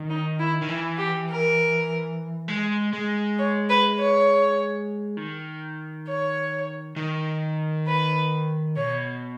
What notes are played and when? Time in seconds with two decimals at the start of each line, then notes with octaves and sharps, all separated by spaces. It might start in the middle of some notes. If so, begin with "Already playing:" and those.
Already playing: D#3
0.09 D#4
0.39 E4
0.62 D#3
0.69 E3 E4
0.98 G4
1.29 A#4
2.48 G#3
2.93 G#3
3.38 C#5
3.68 B4
3.98 C#5
5.17 D#3
6.07 C#5
6.96 D#3
7.86 B4
8.76 B2 C#5